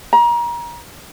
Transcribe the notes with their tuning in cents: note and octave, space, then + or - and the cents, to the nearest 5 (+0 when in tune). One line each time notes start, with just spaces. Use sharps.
A#5 +30